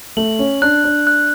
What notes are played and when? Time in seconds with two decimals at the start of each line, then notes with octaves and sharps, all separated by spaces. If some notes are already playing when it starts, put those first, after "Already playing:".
0.17 A3 F#7
0.39 C#4
0.62 D4 F#6
0.84 D4
1.07 F#6